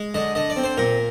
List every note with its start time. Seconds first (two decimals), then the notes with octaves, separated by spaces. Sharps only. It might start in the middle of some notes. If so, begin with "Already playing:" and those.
Already playing: G#3
0.14 D3 D#5
0.35 D3 D#5
0.50 D5
0.56 C4
0.64 C5
0.78 A#2 A#4